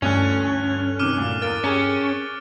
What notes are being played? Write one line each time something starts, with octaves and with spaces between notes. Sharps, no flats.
D2 G2 D3 E3 C#4 A4 F#6 F7
C3 D#3 D6 F6 D#7
D2 A#2
E2 A#3 F6 A6 D7
C#4 G4 G#4 A#4